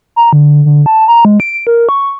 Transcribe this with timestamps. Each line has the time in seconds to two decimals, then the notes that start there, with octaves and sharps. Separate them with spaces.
0.16 A#5
0.33 D3
0.66 D3
0.86 A5
1.08 A#5
1.25 G#3
1.40 D7
1.67 A#4
1.89 C#6